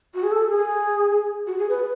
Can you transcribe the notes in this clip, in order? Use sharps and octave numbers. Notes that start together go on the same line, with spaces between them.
F#4
G#4
A4
G#4
F#4
G#4
B4